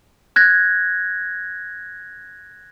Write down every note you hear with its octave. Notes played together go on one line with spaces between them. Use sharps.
F#6 G#6 A#6